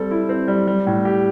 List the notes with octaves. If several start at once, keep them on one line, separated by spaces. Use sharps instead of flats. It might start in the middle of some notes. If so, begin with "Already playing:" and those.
Already playing: G3 C4 A4
E4
C4
G3
G3
A2
G4